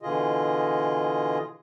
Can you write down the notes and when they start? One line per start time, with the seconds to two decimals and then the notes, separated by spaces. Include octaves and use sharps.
0.02 B2 D3 E3 F4 G#4 D#5